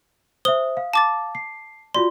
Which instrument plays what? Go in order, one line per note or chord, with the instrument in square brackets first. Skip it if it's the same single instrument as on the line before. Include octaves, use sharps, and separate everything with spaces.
[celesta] C5 E5 [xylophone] D#6 G7
[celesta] F5
[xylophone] A5 D6 A6
[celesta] C7
[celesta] F4 F#4 D5 [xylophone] C6